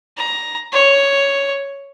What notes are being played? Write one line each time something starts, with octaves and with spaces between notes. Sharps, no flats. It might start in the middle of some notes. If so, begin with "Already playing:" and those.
A#5
C#5